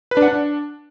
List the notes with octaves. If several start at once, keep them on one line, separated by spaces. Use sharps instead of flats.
B4
D4
F#5
D4